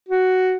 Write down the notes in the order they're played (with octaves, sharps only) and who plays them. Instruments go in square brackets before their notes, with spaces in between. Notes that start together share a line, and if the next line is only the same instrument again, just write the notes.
[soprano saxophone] F#4